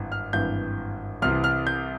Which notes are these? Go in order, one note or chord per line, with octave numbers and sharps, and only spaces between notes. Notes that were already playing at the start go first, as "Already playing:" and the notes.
Already playing: G#1 G2 E3
F6
G#1 G2 E3 G6
C2 C3 E3 F6
F6
G6